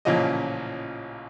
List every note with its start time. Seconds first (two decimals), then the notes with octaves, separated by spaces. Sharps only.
0.05 A1 A#2 C#3 F3 C#5 D#5